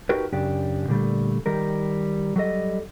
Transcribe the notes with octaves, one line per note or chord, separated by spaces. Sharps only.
D#4 F#4 G4 A#4 B4
F#2 C#3 D4 G4
A#2 D3 G3 A3
D#3 G3 A#4
F#3 G3 A4 D#5